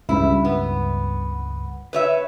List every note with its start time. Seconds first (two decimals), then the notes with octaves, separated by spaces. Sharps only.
0.09 C#2 G2 E4
0.45 B3
1.93 B4 C#5 E5